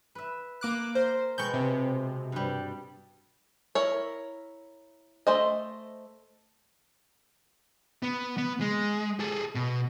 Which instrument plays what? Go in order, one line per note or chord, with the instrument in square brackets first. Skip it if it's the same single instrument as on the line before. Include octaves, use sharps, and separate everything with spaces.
[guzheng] B4 E5
[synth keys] A#3 D6 F#6
[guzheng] A#4 [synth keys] C5
[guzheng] B2 G#3 G5 [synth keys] C#6 G6
[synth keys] C3
[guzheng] G2 G3
[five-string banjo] E4 A#4 C#5
A3 C5 D#5
[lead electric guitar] B3
B3
G#3
G#4 A4
B2